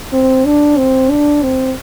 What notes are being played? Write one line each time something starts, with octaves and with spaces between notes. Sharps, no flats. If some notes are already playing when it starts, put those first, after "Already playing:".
C4
D4
C4
D4
C4